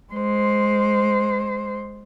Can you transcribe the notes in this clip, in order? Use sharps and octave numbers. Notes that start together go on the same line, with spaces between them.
G#3 C5